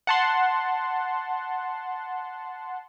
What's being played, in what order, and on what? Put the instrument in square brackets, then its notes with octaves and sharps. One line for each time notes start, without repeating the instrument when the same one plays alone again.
[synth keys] F#5 A5 C6